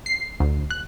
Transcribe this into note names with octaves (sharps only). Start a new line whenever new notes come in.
C7
D2
F#6